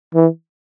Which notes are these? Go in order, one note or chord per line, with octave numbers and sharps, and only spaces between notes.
E3